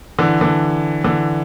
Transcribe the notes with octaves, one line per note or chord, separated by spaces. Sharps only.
D3 E3
D3 E3
D3 E3